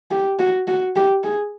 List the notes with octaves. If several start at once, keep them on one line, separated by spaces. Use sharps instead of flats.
G4
F#4
F#4
G4
G#4